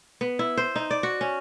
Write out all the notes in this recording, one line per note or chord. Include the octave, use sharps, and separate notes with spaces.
B3
E4
C5
D#4
D5
F#4
C#4